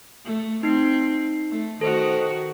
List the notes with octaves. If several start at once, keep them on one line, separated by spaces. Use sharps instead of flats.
A3
C4 D#4 C7
A3
D#3 F#4 A4 C5